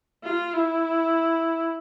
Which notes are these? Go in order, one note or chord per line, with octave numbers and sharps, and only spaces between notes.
F4
E4